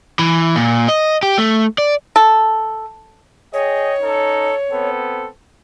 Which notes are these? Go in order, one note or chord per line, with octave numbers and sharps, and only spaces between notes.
E3
A#2
D#5
G4
A3
D5
A4
G#4 C#5 D#5 G5
C#4 D#4 A4
B3 C4 A4